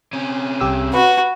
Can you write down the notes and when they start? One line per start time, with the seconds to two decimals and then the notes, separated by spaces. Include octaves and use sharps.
0.13 C3 C#4
0.60 C2 G4 E6
0.94 F#4 B4